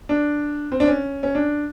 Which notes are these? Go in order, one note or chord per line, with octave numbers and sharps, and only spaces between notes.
D4
C4
D4
C#4
C#4
D4